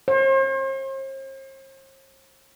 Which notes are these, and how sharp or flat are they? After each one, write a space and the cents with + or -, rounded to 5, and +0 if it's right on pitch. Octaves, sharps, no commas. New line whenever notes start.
C5 +45